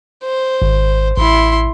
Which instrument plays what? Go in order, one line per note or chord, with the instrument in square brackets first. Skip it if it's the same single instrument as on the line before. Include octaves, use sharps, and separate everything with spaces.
[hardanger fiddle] C5
[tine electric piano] G#1
[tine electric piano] A1 [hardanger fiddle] E4 C6